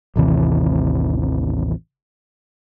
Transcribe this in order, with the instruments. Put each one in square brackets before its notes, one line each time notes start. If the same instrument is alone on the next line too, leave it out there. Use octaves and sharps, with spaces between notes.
[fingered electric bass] A1 D#2 C3 E3